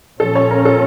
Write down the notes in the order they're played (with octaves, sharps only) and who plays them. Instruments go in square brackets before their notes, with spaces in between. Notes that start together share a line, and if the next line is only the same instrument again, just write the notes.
[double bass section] A#2 F3 C#4 [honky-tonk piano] A4
[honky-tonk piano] C#5
A#4
A4